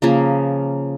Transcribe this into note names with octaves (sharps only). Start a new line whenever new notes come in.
C#3 F3 A#3